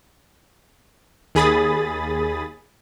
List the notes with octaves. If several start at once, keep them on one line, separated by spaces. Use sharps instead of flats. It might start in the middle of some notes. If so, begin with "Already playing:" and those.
D#2 G#4 B5 D#6 A6